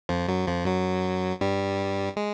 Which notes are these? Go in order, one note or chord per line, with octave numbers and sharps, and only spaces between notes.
F2 F3
F#2 F#3
F2 F3
F#2 F#3
G2 G3
G#3